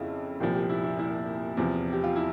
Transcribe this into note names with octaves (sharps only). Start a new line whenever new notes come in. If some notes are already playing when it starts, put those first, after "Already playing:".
Already playing: F2 C#3 E4 F4
C2 A#2 F3 G4
G4
E4
E4
E4
E2 C3 F3
G4
F4
E4